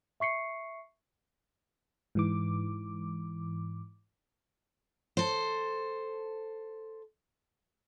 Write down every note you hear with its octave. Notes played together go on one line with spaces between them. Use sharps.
E5 C#6 C7 C#7
G#2 E3 D6
A4 C5